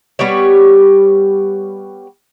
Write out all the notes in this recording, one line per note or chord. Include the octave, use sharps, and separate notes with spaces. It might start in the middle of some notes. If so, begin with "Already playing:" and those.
G3 B3 G4 C#5